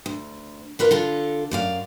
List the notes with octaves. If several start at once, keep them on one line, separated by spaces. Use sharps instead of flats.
D2
F4 A#4 B4 D5
D3 F4 A4
F#2 D5 F5